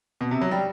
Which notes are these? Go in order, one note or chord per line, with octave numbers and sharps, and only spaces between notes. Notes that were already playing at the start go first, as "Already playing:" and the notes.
B2
C3
F#3
G3